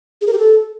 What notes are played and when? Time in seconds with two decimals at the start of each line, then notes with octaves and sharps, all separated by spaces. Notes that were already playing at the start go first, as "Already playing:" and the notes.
0.21 G#4
0.27 A#4
0.33 G4
0.38 A4